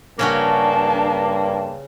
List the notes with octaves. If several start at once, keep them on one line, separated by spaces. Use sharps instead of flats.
G2 C#3 A#3 C#4 D4 F#4 A5